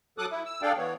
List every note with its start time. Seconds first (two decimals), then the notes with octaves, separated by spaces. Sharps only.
0.18 F#3 A4 D6 D#6 F#6
0.31 E4
0.46 E6
0.62 D4 G#4 A4 D5 F5 G5
0.77 E3 B3 C#5